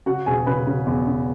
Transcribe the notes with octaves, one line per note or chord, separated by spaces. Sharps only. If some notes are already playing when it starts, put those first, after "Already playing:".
C#3 F#4 F#5
E1 G#4 G#5
C#3 B4 B5
C#3
E2
C#3